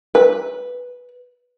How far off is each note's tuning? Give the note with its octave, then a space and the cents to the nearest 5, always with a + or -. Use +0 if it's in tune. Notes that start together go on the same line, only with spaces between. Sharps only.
B4 +0